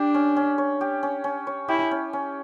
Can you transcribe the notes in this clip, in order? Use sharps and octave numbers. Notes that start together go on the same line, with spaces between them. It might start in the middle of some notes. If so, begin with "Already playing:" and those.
Already playing: D4 G4
C#4
C#4
C#5
G4
C#4
C#4
C#5
E4 G4
C#4
C#4